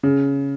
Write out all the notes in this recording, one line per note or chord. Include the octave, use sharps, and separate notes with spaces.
C#3